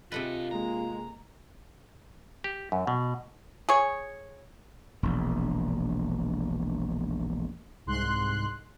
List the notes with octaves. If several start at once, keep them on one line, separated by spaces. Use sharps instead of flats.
C3 D4 F4 A4 B4 D#5
G#3 A#3 A#5
G4
F#2
B2
G#4 C#5
E1 A#1
C2 G#2 C6 F#6